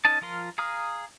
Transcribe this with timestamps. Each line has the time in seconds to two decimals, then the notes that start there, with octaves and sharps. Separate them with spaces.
0.05 C#4 D#4 D#5 A5
0.21 F3 F4 A#4 C6
0.58 G#4 F5 A#5 D#6 F6